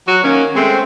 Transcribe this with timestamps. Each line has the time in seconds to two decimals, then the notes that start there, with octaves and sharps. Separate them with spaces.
0.08 F#3 F#4
0.24 D#3 A#3 C#4
0.56 G#3 A3 C4